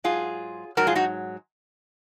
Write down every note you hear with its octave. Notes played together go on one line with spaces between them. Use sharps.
G#2 F#3 F4 G#4
G#2 F#3 F#4 A#4
F4 G#4
D#4 F#4